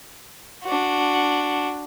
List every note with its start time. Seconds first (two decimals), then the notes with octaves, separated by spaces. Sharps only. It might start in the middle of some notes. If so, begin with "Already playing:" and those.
0.64 D4 F#4